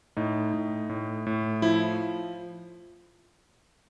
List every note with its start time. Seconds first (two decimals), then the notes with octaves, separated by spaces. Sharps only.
0.17 A2 D#4
0.54 A2
0.89 A2
1.27 A2
1.62 F3 E4